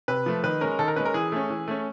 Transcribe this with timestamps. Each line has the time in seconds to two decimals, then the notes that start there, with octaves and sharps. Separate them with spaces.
0.08 C3 B4
0.26 F3 A3
0.44 D#3 B4
0.61 G#3 C#4 A#4
0.79 D#3 A4
0.88 A#4
0.96 C#4 B4
1.00 G#3
1.05 A#4
1.14 E3 G#4
1.32 A3 C#4
1.50 E3
1.68 A3 C#4